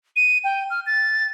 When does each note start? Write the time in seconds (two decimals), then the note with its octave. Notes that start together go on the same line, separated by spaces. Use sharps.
0.16 D#7
0.44 G5
0.70 F6
0.86 A6